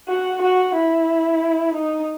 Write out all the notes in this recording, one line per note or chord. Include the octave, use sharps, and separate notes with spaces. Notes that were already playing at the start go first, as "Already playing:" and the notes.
F#4
F#4
E4
D#4